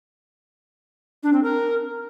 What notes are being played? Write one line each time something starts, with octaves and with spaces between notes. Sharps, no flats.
D4
C4
A#4